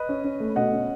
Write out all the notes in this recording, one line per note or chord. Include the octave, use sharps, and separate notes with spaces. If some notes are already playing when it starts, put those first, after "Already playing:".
Already playing: B4 D#5
C#4
C#4
A3
B2 D#5 F#5
C#4